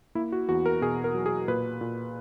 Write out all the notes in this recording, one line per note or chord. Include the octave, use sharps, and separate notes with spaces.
A#3 E4
F#4
E2 F#4
A#4
B2 G#4
A#4
F#3
G#4
A#2 B4
A#2